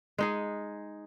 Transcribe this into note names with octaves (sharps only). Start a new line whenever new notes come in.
G#3 D#4 G#4